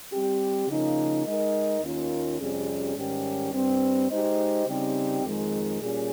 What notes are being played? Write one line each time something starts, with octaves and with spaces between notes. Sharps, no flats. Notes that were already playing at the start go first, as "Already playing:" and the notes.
G3 C4 G4
C#3 F3 A#3 D#4
G#3 D#4 A#4 D#5
D#2 D#3 A#3 C#4 F4
F2 C3 G3 C#4 G#4
G#2 D#3 G3 C#4 G4
G2 G3 C4
G#3 D#4 G4 C5 D#5
C#3 G3 C4 D#4 G4
F2 D#3 G#3
A#2 G3 C#4 G#4